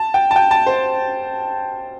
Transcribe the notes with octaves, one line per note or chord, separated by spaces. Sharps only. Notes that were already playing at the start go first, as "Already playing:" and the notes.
Already playing: A5
G5
A5
G5
A5
C5